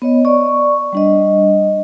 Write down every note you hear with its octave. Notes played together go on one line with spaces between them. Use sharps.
B3 C#5 D#5
D5 C#6
G3 D4 D#5